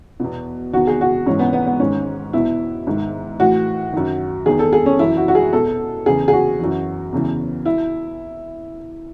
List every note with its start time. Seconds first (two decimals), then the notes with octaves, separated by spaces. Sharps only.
0.20 E2 B2
0.73 E2 D#3 F#4
0.87 G#4
1.01 F#4
1.26 G#2 E3 C#4
1.39 B3
1.53 B3
1.66 B3
1.80 G#2 D#3 C#4
2.33 E2 B2 E4
2.87 G#2 D#3
3.40 A2 E3 F#4
3.93 F#2 D#3
4.46 E2 D#3 G#4
4.59 A4
4.73 G#4
4.86 C#4
4.99 F#2 E3 E4
5.17 F#4
5.28 F#4
5.35 G#4
5.52 E2 B2 A4
6.06 E2 C#3 E3 G#4
6.28 G#4
6.33 F#4
6.59 F#2 E3
7.12 E2 C#3 E3
7.65 E4